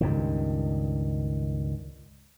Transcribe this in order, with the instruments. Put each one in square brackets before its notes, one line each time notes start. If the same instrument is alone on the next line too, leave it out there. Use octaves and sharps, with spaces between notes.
[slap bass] C#2 G2 D#3